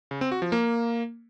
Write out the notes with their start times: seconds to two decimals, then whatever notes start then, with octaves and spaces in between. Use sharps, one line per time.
0.11 C#3
0.21 C4
0.32 F#4
0.42 F3
0.52 A#3